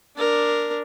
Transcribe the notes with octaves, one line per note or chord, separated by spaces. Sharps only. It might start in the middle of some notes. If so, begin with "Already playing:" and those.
D4 A#4